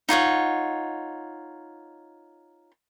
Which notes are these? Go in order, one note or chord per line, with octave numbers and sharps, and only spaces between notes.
D#4 F4 C#5 F#5